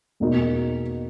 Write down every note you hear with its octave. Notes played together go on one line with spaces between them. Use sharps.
E2 B2 A#3 D#4 F#4